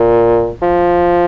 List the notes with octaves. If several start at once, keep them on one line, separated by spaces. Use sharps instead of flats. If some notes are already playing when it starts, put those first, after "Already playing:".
Already playing: A#2
F3